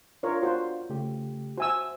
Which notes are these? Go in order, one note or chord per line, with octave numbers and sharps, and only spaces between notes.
D4 F4 A#4 C#5 D5 F5
F4 F#4 C5
C#3 A3 G4
F#4 C5 E5 G#5 E6